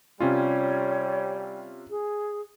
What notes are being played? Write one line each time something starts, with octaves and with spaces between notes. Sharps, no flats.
C3 G3 C#4 F4 C#5
G#4